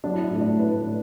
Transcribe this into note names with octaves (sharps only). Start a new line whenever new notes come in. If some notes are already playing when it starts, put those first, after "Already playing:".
F#3 D4
E4
D4
A2 E4
D4
A2 B4
A2